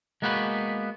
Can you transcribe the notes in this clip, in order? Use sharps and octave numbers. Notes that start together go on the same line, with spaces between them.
G#3 A#3 B3 F#4 G4 B4